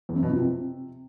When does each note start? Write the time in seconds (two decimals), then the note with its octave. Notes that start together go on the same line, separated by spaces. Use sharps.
0.09 E2
0.16 F#2
0.23 B2
0.30 F3
0.36 C3